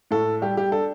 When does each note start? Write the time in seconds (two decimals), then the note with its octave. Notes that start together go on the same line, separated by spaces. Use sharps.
0.11 A2 A4
0.42 G3 G4
0.57 G4
0.72 D4 A4